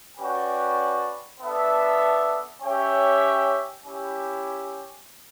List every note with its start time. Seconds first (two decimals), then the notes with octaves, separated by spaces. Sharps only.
0.17 C#4 F#4 B4 D5 G5
1.39 B3 D4 A4 E5
2.61 C#4 G4 C#5 E5 G5
3.84 C#4 E4 G4